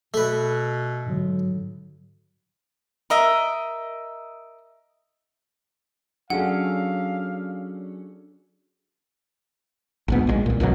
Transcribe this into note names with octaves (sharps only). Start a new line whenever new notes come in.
B2 A3 B4
G#2 D3 F#3
A#4 D#5 E5
F#3 C#4 D4 G#4 A4 F5 F#5
A#1 G#2 B3
A#1 D3 G#3
C2 A#2
C#2 B2 F3 F#3